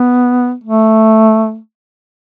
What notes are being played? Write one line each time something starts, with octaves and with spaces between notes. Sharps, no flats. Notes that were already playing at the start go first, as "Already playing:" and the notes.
Already playing: B3
A3